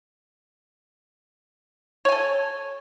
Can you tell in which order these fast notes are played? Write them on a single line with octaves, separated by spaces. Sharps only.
C#5 G#5 A4